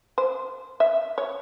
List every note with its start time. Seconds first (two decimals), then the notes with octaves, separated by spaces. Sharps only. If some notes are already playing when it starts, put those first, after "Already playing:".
0.18 C5
0.80 E5
1.18 C#5